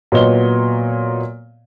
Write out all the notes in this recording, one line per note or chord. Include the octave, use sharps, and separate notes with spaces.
A#2 F#3 B3 C#5 D#5 G7